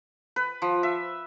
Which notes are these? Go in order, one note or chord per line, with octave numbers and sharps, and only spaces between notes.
B4
F3
E5